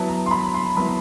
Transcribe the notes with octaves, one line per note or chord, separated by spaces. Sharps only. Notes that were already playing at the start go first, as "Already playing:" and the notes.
Already playing: F#3 B3 E4 A5
A#5
C6
B5
C6
F#3 B3 E4 B5